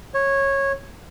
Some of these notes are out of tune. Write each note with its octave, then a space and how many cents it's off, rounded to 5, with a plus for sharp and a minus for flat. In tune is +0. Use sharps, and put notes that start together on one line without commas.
C#5 -15